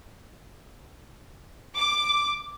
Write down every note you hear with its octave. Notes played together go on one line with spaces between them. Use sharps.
D6